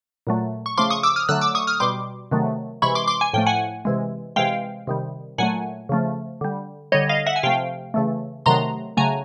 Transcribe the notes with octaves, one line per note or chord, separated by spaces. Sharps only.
A#2 F#3 A3
C#6
C#3 F3 A3 C6 D6
C#6 D#6
D6 E6
D#6 F6
D3 F#3 A3 E6 F#6
D6 E6
C#6 D#6
D#6 F6
B2 G3 C6 D6
C3 D#3 F#3 A3
C3 E3 G#3 B5 C#6
C6 D6
C6 D6
G#5
A2 F3 A3 G5
F#5 G#5
C3 E3 G#3
C3 E3 G#3 F5 G5
C3 D#3 G3
A#2 F#3 A3 F#5 G#5
C#3 F3 A3
D3 G3
D3 G3 C#5 D#5
D#5 F5
E5 F#5
G#5
C3 F3 A3 F5 G5
C#3 E3 A3
C3 D#3 F#3 A3 A#5 C6
C#3 F#3 A3 G#5 A#5